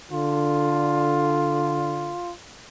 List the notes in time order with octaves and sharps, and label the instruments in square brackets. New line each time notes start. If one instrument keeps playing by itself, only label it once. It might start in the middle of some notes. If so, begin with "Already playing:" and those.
[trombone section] D3 [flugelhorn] F4